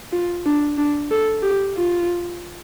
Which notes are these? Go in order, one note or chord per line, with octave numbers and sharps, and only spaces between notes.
F4
D4
D4
A4
G4
F4